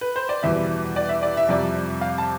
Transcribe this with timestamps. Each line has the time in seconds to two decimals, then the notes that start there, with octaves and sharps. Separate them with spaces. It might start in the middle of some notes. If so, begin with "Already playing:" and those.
0.01 B4
0.16 C5
0.29 D5
0.43 E2 B2 G3 E5
0.96 D5
1.09 E5
1.23 D5
1.37 E5
1.49 F2 C3 G3 D5
2.01 F5
2.18 A5